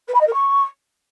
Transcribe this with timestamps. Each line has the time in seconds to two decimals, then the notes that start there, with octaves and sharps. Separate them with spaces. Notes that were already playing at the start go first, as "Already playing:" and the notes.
0.08 B4
0.14 B5
0.20 D#5
0.27 A#4
0.33 C#6